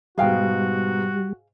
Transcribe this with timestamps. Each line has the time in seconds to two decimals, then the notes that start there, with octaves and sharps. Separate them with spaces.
0.18 G#2 B2 G3 F#4 G#4 F5 G5